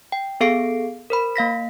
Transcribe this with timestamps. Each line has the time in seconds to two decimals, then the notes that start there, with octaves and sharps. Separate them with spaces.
0.12 G5
0.40 B3 G#4 A4 F5 C7 D7
1.10 A#4 C5 B5
1.36 A#3 F5 A#6 B6